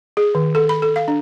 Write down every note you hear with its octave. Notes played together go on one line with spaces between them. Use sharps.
G#4
D#3
A4
B5
A4
F5
D4